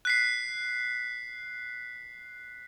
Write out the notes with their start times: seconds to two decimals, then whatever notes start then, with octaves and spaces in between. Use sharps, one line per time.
0.05 F#6 B6 C7